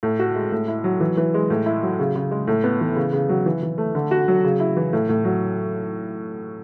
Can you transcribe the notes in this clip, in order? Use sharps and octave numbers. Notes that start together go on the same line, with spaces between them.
A2
F#4
G#3
A2
E4
F#3
E3
E3
G#3
A2
E4
F#3
C#3
C#3
G#3
A2
B3
E3
C#3
C#3
F#3
E3
E3
A3
D3
F#4
F#3
C#3
E4
E3
A2
A2
F#3